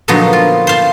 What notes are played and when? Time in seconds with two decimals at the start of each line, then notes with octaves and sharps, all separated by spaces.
0.08 A#2 D3 F3 F#3 B3 D#4
0.33 F4
0.67 C5 F5 A5